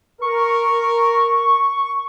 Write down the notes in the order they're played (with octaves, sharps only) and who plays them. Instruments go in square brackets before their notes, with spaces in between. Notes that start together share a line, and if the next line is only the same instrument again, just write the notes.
[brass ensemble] A#4 [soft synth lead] C#6